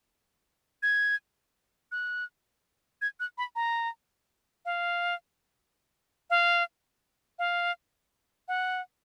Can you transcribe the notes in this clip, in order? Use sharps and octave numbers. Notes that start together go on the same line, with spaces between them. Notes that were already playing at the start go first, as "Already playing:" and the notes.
G#6
F#6
G#6
F#6
B5
A#5
F5
F5
F5
F#5